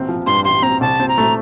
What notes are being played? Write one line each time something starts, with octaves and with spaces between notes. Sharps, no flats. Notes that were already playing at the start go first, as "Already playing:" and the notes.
Already playing: A1 C4
F3
G2 C6
A1 C6
C4 A#5
C2 A5
C4
A#5
A3